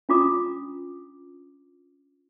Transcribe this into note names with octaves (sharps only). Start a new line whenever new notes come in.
C#4 D4 F4 A#5 D6 D#6